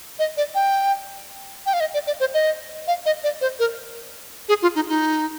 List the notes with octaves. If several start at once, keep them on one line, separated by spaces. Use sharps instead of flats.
D#5
D5
G5
G5
F5
D#5
D5
D5
C5
D#5
F5
D#5
D5
C5
A#4
G#4
F4
D#4
D#4